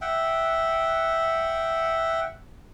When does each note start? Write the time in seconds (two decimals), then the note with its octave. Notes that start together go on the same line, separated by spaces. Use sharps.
0.01 E5 F#5 G5